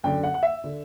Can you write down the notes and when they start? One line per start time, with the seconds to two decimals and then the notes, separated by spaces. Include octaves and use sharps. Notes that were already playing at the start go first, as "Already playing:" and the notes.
0.04 F#2 D3 G5
0.24 F#5
0.34 F#5
0.43 E5
0.64 D3